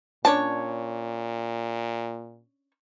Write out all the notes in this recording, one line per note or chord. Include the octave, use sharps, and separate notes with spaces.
A#2 C#4 D4 C#5 A5